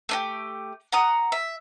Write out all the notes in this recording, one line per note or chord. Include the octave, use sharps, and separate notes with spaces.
A3 D4 G4
F#5 A#5 D#6
E5